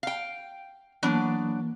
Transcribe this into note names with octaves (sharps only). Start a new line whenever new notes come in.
F5 G5
E3 F#3 A#3 B3 D4